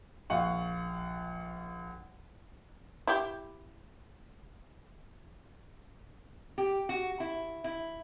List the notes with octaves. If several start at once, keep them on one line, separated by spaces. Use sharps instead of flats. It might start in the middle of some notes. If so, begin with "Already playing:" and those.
A#1 F5 F#5 C#6
E4 G4
G4
F#4
E4
E4